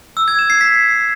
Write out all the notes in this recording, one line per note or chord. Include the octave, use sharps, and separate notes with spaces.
E6
G#6
E7
C7
B6